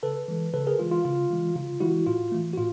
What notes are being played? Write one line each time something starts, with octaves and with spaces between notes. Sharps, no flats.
C#3 A4 B4
E3 G#3
C#3 A4 B4
G#4 A#4
E3 G#3 F4
F4
C#3 F4
E3 G#3
C#3 F4
E3 G#3 E4 F#4
A2 F4
E3 A3
F#4
A2 F4